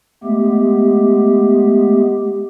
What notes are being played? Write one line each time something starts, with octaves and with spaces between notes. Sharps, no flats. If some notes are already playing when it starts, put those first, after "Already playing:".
G#3 A3 B3 G4